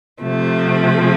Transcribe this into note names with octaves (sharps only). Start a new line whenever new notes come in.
C3 F3 A3